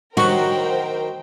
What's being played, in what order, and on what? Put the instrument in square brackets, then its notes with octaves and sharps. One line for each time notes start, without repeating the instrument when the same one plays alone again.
[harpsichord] D#3 F#3 B5 [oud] F#4 [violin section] A#4 C5 G5